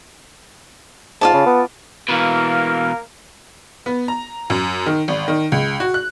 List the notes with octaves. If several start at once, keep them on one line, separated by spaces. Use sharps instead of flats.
G#2 F4 D5 A5
C#3
B3
B2 E3 A#3 A#4 F5
B3
A#5
F#2
D#3
G#1
D#3
C#2
F#4
F#6